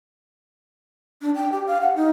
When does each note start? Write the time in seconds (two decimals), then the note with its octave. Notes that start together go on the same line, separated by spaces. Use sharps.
1.22 D4
1.35 G5
1.52 G4
1.67 F5
1.81 F#5
1.96 D#4